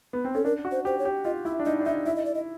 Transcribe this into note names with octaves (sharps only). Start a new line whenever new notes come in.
B3
C4
C#4 A4
D4 A#4
F#4
C5
G4 C5
C#5
G4
F4 D#5
E4 E5
D4
D#4 D#5
D4
D#4 E5
E4 E5
D#5
D5
D#5